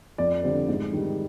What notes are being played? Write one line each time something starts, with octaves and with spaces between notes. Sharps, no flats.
F2 D5
D3 G3 C4
G#2
D#3 G3